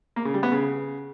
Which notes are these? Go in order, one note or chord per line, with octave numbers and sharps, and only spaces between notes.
A#3
C#3
G3
B3
C#3